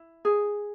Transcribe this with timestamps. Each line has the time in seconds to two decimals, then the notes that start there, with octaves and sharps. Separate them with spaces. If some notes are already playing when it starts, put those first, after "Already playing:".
Already playing: E4
0.25 G#4